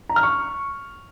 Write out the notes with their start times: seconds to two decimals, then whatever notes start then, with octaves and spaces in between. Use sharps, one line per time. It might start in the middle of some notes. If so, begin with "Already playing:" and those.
0.09 A#5
0.16 F6
0.23 C#6